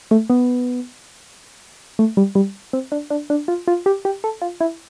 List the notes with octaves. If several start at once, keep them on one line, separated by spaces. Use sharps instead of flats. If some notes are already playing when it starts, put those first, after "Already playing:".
A3
B3
A3
G3
G3
C4
D4
D4
D4
F4
F4
G4
G4
A4
F4
E4